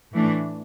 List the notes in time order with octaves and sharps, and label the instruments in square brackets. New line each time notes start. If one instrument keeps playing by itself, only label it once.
[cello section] A2 E3 A3 D4